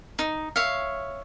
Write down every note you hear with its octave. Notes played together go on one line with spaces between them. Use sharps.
D#4
C#5 E5 F5